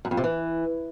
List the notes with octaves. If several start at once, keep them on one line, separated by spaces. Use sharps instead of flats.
F#2
F2
C3
E3